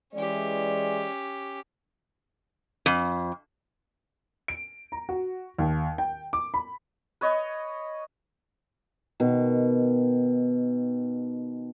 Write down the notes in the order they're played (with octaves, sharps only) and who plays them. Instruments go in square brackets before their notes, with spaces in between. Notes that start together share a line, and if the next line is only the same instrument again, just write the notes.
[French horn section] E3 G#3 D5 [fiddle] C#4 G4
[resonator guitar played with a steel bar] F2
[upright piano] D7
A#5
F#4
D#2
G5
D6
B5
[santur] B4 C#5 D#5
[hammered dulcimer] B2 D#3